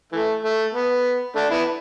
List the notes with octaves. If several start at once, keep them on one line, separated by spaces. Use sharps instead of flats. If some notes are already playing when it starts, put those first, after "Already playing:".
E3 A3
A3
B3
A3 D4
B3 E4